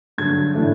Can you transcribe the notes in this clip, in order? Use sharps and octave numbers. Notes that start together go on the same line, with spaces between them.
G2 D3 F#3 G#6
A2 E3 A3 D4